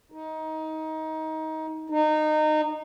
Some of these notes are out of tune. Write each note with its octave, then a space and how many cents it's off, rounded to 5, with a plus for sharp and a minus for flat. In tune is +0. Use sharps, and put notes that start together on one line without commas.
D#4 +20
D#4 -20